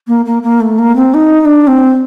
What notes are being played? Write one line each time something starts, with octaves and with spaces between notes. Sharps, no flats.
A#3
A#3
A#3
A3
A#3
C4
D#4
D#4
D4
C4